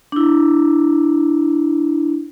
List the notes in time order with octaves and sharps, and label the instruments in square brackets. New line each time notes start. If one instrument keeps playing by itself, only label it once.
[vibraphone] D4 E4